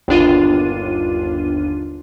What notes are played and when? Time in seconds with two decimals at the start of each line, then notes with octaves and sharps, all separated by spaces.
0.08 G1 D#2 D4 F4 D#7